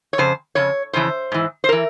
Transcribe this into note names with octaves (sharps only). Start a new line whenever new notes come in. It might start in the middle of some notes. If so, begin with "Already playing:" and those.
C#5
F2 C#3 C5
F2 C#3 C#5
F2 C#3 E3 C5
G#2 E3
C5
E3 A#4